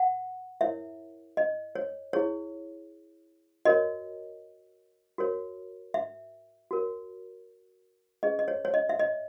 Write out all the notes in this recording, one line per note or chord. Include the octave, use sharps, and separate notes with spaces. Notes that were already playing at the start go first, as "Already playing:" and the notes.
Already playing: F#5
E4 A#4 C#5 E5
D#5
C#5
E4 G#4 C#5
F#4 A#4 C#5 D#5
F#4 A#4 C#5
E5
F#4 A#4 C#5
C#4 G#4 B4 D#5
D#5
C#5
C#5
D#5
E5
D#5